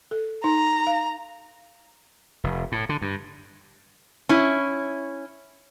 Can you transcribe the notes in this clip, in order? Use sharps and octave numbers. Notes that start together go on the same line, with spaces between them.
A4
D#4 A#5
F5
F1
A2
D3
G2
C#4 E4